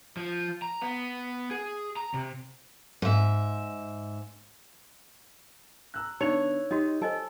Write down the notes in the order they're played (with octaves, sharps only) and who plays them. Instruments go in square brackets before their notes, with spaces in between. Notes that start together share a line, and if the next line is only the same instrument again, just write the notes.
[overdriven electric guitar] F3
A#5
B3
G#4
A#5
C3
[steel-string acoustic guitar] G#2 E5
[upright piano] A#5 E6 F#6
[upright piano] D3 B3 F7 [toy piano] D#4 D5 E5 [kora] C#5
[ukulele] D#4 [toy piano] F#4 D#5 [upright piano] G4
[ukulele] A4 [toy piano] C5 D#5 G#5